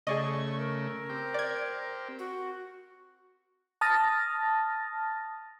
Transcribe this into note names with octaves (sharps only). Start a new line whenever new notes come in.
C#3 A3 G#4 D5 D#5 C#6
A#4
C4 G4
D5 G#6
F#4
A5 D#6 F6 A6 A#6